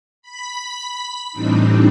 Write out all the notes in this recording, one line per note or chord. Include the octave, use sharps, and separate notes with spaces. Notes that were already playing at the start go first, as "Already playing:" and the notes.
B5 B6
A2 E3 G3 C4 D4 D#4